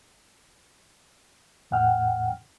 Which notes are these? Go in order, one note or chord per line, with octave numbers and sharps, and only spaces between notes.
E2 A2 F#5 G5 F6